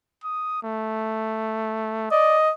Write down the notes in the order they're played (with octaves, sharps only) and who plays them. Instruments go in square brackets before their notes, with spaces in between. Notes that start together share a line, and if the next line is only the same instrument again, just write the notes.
[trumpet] D#6
A3
[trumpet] D5 [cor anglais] D#5